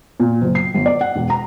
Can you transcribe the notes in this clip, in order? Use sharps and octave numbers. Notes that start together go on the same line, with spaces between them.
A#2
F#1
C7
G1
D5
F#5
E1
A#5